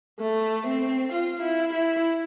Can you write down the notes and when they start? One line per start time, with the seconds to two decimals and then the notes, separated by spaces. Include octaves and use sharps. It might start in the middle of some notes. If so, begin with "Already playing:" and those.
0.20 A3
0.67 C4
1.12 F4
1.42 E4
1.73 E4